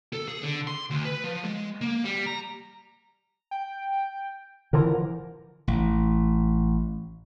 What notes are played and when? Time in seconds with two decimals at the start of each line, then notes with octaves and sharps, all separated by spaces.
0.13 A4
0.28 G#4
0.43 D3
0.67 C6
0.90 D2
1.05 B4
1.24 F3
1.44 G#3
1.81 A#3
2.05 G3
2.26 A#5
3.51 G5
4.73 D3 E3 F3 A#4
5.68 A1